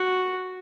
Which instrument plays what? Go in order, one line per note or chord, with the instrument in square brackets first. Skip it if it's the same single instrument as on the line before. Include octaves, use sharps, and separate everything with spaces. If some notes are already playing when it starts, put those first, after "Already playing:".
Already playing: [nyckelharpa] F#4